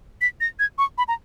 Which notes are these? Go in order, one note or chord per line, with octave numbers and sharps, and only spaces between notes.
B6
A#6
G#6
C#6
B5
A#5